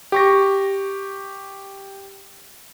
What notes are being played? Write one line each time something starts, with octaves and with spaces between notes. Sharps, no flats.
G4 C#6 A#6